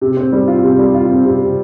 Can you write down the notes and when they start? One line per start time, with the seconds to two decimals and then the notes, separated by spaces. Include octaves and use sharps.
0.01 C3
0.17 C4
0.32 G3
0.48 F4
0.63 C3
0.78 G3
0.94 F4
1.10 C4
1.25 C3
1.40 C3